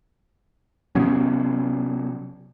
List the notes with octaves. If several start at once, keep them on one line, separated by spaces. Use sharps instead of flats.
C3 F#3 B3 C#4